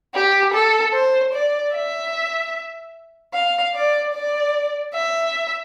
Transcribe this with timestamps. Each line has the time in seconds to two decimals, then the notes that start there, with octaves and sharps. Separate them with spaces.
0.14 G4
0.54 A4
0.94 C5
1.33 D5
1.74 E5
3.34 F5
3.74 D5
4.14 D5
4.94 E5